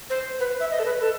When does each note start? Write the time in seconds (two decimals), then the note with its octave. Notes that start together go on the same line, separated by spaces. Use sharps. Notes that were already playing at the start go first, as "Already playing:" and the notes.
0.10 C5
0.40 B4
0.60 E5
0.71 D#5
0.79 A4
0.85 B4
1.01 A4